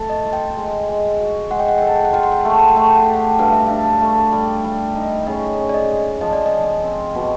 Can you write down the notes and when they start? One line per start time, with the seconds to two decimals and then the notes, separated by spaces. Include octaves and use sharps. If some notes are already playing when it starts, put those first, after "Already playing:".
Already playing: A3 A4
0.10 D#5
0.25 F4
0.33 G5
0.56 G#3
0.88 G#3
1.19 F#4
1.50 G#3 F#5
1.59 G5
1.68 F#5
1.78 A4 G5
1.87 F#5
1.96 G5
2.05 F#5
2.13 F4 G5
2.23 F#5
2.32 G5
2.41 A3 F#5
2.50 G5
2.60 F#5
2.69 G5
2.76 A3 F#5
2.87 G5
2.96 F#5
3.05 G4 G5
3.14 F#5
3.39 G2 F5
3.53 E5
3.67 D4 F5
4.01 A3
4.32 G3
4.64 G3
4.95 D#4
5.27 C#3 D#5
5.58 C#4
5.69 D5
5.74 D#5
5.90 G#3
6.21 F3 D#5
6.33 D5
6.46 D#5
6.52 F3
6.83 C4
7.15 B2